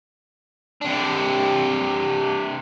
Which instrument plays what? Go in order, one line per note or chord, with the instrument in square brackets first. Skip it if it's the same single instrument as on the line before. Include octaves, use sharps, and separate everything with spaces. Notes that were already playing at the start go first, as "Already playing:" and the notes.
[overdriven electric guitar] C3 D4